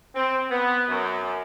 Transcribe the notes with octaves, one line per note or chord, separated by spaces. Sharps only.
C4
B3
F#2